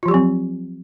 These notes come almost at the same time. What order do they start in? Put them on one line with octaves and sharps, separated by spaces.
F4 F3 G4 F#3 C4